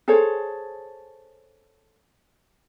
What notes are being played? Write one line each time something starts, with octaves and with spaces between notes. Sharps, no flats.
G#4 A4 C5 C#5